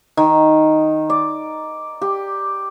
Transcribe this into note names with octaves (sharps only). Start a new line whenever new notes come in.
D#3
D5
G4